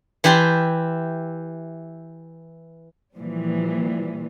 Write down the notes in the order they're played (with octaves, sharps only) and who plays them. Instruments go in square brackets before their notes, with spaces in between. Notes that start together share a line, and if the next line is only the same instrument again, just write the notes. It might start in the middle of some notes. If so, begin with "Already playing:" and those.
[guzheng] E3 E4 G4 A5 C6
[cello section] A#2 E3 F3 G3